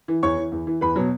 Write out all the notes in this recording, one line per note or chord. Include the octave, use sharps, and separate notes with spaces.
E3
E2 C#5 C#6
E3
E2
E3
E2 B4 B5
B2 F#3